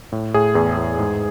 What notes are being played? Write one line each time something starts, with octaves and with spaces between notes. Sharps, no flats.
A2
A2 G#4
E2 G#4
E2
G#2